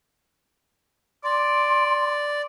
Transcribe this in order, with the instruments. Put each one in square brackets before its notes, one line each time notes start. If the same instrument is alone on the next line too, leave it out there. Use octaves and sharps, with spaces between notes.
[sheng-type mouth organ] D5 [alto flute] C6 [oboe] D6